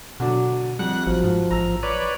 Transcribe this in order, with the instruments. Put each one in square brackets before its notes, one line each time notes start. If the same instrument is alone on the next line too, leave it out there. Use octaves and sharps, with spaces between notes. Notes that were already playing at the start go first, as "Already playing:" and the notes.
[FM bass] B2 [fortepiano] D3 F#3 D4
[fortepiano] F2 [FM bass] G3 [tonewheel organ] F#5 F#6
[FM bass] A1 [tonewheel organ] F3 [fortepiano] F#3
[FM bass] G#2
[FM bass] A1 [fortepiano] A#5 E6
[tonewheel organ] B4 C#5 D5